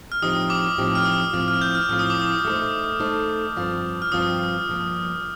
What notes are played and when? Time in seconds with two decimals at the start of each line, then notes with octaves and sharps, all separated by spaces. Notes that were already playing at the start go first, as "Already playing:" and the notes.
0.12 F6
0.22 A2 F3 C4 D#4 G4 D#6
0.50 D6
0.78 A2 F3 C4 D#4 G4
0.95 F6
1.05 D#6
1.33 A2 F3 C4 F4 F6
1.48 F6
1.62 G6
1.75 F6
1.89 A2 F3 C4 F4 F6
1.99 D#6
2.10 D6
2.20 D#6
2.45 A3 D#4 A4 C5
3.00 A3 D#4 A4 C5
3.56 G2 F3 C4 F4 C5
4.02 F6
4.12 G2 F3 C4 F4 C5 D#6
4.68 G2 F3 A#3